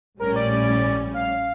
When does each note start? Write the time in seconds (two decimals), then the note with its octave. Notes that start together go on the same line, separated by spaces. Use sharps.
0.20 A#1 A2 G3 C#4 A#4
0.36 D5
0.51 D5
1.14 F5